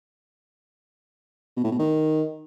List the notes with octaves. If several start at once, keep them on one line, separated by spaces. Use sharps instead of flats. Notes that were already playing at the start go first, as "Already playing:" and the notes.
B2
A2
B2
D#3